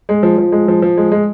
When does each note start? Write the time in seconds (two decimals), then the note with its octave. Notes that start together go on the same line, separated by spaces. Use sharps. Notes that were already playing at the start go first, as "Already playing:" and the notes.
0.09 G#3
0.23 F3
0.38 F3
0.52 G#3
0.68 F3
0.82 F3
0.97 G#3
1.12 G#3